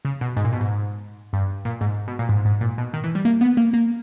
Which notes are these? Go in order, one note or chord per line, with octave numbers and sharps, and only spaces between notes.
C#3
B2
G#2
A#2
B2
G#2
G2
A#2
G#2
B2
A#2
G#2
G#2
A#2
B2
D#3
E3
G3
A#3
B3
A#3
A#3